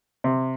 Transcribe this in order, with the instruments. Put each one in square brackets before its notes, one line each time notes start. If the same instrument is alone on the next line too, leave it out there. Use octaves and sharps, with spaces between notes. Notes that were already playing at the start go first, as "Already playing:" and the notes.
[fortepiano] C3